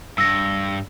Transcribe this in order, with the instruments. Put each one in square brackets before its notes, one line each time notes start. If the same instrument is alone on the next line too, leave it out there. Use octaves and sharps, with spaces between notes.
[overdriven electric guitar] G2 [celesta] E6 A#6